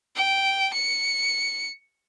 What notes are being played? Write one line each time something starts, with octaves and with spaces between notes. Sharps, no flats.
G5
C#7